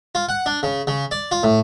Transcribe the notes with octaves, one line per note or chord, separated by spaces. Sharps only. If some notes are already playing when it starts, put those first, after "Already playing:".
F4
F#5
D4
C#3
C#3
D5
F4
A2